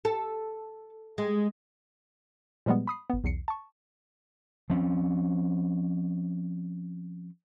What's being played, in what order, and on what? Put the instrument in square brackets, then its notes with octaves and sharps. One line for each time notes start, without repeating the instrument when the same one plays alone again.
[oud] A4
G#3
[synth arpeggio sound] A#2 F3 G3 G#3 B3
B5 D#6 C7
G1 B3
B1 E2 C7 C#7
A5 C#6
[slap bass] F3 C4 C#4